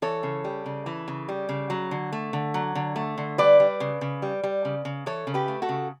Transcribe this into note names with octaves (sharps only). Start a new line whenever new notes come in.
E3 A4 C#5
C#3
G3
C#3
E3
C#3
G3
C#3
F#3
D3
A3
D3
F#3
D3
A3
D3
G3 B4 D5
G3
C#3
C#3
G3
G3
C#3
C#3
E3 A4 C#5
C#3
G4 B4
A3
F#4 A4
C#3